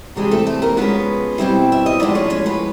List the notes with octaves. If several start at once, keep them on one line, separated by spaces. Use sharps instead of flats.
C3 E3 G3 G#3 C4 G#4
A3 A4
A3 A4
A#3 A#4
F3 G#3 B3 C#4 B4
B2 G3 C4 E4
E5
D#5
A2 F3 G#3 B3 D4 D5
C#4 C#5
C#4 C#5
B3 B4